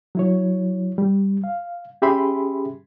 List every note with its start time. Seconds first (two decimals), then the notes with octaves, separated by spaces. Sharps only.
0.15 F#3 E4 C#5
0.98 G3
1.44 F5
2.02 C#4 G4 G#4 E5 B5 C6